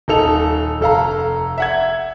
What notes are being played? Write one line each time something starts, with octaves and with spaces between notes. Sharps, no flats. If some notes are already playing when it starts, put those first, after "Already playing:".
D#1 D#4 A4 F7
F1 A4 F5 A#5
E5 F#5 G#6